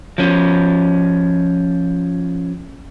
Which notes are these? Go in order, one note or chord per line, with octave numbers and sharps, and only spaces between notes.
F3 C#4